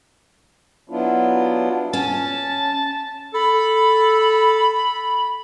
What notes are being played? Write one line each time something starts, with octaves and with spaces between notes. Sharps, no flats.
F#3 B3 D4 E4 F4
C#4 A5
A4 B5